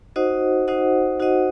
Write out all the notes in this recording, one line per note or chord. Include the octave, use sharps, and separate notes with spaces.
D#4 F#4 C5 D#5 F#5
D#4 F#4 C5 D#5 F#5
D#4 F#4 C5 D#5 F#5